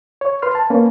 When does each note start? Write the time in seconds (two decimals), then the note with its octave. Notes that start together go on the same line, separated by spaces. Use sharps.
0.21 C#5
0.42 B4 C6 F6
0.55 A5
0.70 A#3 C#4 B4